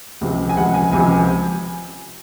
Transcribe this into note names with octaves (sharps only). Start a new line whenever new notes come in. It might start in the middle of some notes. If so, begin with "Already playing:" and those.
C#2 C3 F3
G#5
C#2 C3 F3 F#5
G#5
C#2 C3 F3 G#5